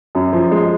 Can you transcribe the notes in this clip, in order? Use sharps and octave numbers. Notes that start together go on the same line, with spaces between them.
F#2
F3
G#3